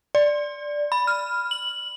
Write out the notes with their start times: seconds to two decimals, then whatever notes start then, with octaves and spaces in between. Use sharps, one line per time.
0.15 D5
0.92 B5
1.07 F6
1.51 F#7